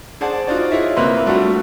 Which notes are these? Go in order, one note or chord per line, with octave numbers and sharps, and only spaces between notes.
G#4 C5 D5 F#5 A5
D#4 F4 F#4 C5 D5
E4 F4 G#4 C#5 D#5 E5
C3 A#3 B4 E5 C6
F#3 G3 A3 D4 F4 F#4